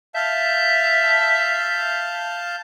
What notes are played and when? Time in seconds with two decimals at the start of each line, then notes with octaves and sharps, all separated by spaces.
0.15 E5 F5 A5 G6